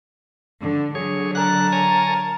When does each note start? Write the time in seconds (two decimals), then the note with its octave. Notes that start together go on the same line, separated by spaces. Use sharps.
0.62 D3
0.95 D3 F#3 G#4 C#5
1.35 A#4 A5 F#6
1.72 C#5 G#5 A#5